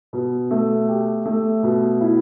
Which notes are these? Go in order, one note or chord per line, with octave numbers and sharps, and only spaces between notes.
B2
A3
G4
A3
B2
E4